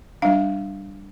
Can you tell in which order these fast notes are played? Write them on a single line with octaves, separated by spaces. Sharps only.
D4 F5 G3